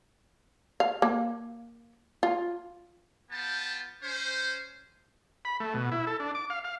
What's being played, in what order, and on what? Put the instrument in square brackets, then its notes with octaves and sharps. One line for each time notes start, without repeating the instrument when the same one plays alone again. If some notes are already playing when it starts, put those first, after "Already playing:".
[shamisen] F5
A#3
F4
[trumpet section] B3 F4 G5 A5
C#4 C5
[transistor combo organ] B5
A3
B2
E4
A4
D4
D6
F5
F5